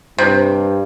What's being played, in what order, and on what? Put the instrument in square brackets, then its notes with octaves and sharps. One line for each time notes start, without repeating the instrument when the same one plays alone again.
[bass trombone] G2 [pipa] C3